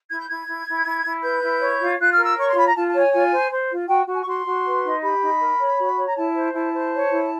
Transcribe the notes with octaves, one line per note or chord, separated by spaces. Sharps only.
E4 G#6
G6
E4 G#6
E4
E4
E4
E4
B4 G6
E4
C#5
F4
F4 F#6
F6
A#4
E6
C#5 C#6
C6
F4 B5
A#5
F4 A5
A5
C#5
G#5
F4 G#5
C5
C5
F4
F#4 G5
F#4
G#5
C#6
F#4 C6
F#4
B4
D#4
G4 B5
D#4
A#4
C#5
F#4
C#5
A#5
E4 A5
C5
E4 A5
C5
C#5
E4